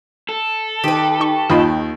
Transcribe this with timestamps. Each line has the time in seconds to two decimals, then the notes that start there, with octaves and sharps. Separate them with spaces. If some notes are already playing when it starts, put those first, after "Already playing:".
0.29 A4
0.84 D#3 G4 B4
1.20 D#4 C#6
1.50 D#2 D#3 F4 D#5 B5